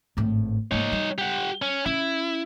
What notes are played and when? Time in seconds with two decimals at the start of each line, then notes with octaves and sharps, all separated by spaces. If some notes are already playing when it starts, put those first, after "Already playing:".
0.17 G#1 A2
0.71 G#2 A#3 D#4 C#5
0.92 G3
1.18 G4 F#5
1.62 C#4
1.86 C#4 E4